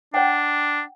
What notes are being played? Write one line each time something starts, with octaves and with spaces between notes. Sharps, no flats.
D4 C#5 F#5 G5